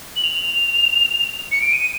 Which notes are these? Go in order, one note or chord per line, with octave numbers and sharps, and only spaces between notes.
F#7
F7
C#7
D7
D#7